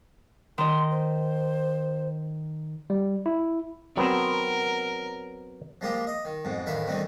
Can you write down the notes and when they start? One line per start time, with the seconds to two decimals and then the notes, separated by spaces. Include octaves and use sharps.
0.58 D#3 D#5 C6
0.91 C5
2.90 G3
3.26 E4
3.97 F#3 B3 C4 A#4
5.81 F3 G#3 A#3 F4 G4
6.07 D#5
6.25 D#3
6.45 F2 G#2 B2
6.66 A1 D2 D#3 E4 F5 B5
6.87 E2 D3 D#3 G3 A3 C4